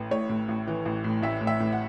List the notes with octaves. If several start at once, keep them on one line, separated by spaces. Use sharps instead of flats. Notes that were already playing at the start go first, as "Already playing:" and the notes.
Already playing: A1 A2 B4
A2 C#5
A2
A1
E3
A1
A2
A1 E5
A2
E5
A2
F#5